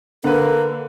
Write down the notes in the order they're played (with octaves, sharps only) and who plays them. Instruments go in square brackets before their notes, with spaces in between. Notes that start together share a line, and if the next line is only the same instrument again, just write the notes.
[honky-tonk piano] D3 [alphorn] A#3 [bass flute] A4 [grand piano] B4 F#5